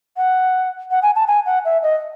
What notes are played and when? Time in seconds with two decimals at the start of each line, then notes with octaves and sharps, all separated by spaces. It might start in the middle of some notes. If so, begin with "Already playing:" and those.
0.17 F#5
0.91 F#5
1.02 G#5
1.15 A5
1.27 G#5
1.46 F#5
1.65 E5
1.82 D#5